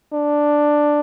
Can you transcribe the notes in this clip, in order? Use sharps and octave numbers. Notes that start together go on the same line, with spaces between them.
D4